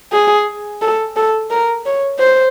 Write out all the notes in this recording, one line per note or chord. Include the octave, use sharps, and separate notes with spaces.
G#4
A4
A4
A#4
C#5
C5